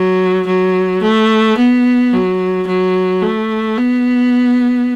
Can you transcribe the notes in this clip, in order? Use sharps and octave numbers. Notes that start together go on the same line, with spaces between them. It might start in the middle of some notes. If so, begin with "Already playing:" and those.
Already playing: F#3
F#3
A3
B3
F#3
F#3
A3
B3